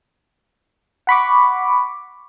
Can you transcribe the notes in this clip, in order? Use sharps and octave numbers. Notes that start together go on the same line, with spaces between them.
F#5 B5 C#6 D6